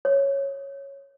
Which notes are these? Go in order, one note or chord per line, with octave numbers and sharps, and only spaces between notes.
C#5